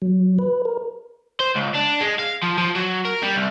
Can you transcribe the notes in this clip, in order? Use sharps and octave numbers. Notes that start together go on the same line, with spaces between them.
F#3
B4
A#4
C5
C#2
D4
G#3
F5
F3
F3
F#3
A#4
G3
C2